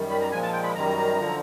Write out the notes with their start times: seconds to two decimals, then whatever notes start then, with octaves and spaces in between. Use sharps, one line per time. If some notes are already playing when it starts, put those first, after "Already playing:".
Already playing: F#2 D#3 G3
0.10 B5
0.21 A#5
0.32 A#2 F3 G#3 G#5
0.42 A5
0.53 G5
0.63 B5
0.75 F#2 D#3 G3 A#5
1.18 D3 F3